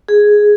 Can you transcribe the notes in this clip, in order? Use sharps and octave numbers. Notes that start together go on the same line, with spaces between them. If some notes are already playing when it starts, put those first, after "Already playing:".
G#4